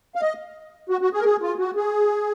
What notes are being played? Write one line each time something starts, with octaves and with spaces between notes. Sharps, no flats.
F5
D#5
F#4
F#4
G#4
A#4
G#4
F4
F#4
G#4